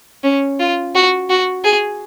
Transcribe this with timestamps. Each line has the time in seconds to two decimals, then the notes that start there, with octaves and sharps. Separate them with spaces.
0.23 C#4
0.59 F4
0.94 F#4
1.30 F#4
1.64 G#4